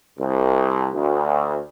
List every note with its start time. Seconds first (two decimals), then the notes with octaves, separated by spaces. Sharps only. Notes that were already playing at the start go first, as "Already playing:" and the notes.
0.19 C2
0.93 D2